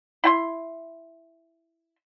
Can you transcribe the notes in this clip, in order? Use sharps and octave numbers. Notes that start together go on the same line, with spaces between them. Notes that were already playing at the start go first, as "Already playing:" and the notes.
E4 G5 C6